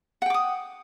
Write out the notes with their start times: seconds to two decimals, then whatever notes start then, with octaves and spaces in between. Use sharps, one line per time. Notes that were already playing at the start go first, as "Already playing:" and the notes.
0.22 F#5
0.26 G5
0.30 D6
0.34 D#6